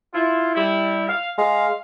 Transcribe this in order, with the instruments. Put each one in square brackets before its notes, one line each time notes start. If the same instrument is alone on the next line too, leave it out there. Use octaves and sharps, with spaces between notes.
[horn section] E4 F4
G3 E4
F5
[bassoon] G#3 [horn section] F5